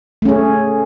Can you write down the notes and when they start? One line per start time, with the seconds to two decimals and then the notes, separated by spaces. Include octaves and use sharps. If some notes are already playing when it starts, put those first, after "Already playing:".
0.22 A3
0.25 C#4
0.29 G#4